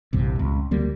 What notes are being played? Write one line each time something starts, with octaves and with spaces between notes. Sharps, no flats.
A#1 E2 G2 C3
C#2
D2 G3 A#3